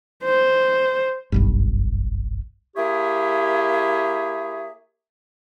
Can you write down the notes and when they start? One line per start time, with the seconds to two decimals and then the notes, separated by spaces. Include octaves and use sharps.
0.24 C5
1.32 F#1 B1 G2
2.76 A#3 E4 G4 G#4 C#5 E5